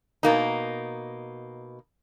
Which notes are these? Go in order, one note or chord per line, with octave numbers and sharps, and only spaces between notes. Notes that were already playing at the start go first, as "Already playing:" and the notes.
B2 A#3 D#4